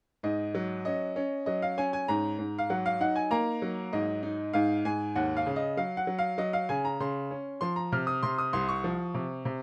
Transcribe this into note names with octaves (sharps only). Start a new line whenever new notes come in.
G#2 D#5
F#3
C#4 D#5
C#4
F#3 D#5
F5
C#4 G#5
G#5
G#2 A#5
G#2
F5
F#3 F#5
F5
D#4 F#5
G#5
A#3 A#5
F#3
G#2 D#5
D#4
G#2 F5
G#2 G#5
D#2 F#5
F5
C#3
D#5
F#3 F5
F#5
F#3
F5
F#3 D#5
F5
C#3 G#5
A#5
C#3 C6
C#4
F3 C6
A#5
C3 F6
D#6
C3 C6
D#6
C2 C6
C#6
F3
C3
C3